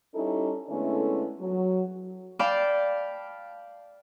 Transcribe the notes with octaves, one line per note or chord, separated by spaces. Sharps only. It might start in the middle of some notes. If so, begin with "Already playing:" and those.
G3 C#4 D#4 E4 A4
D3 G#3 A3 B3 C#4 E4
F#3
D5 F5 G5 A5 B5 D6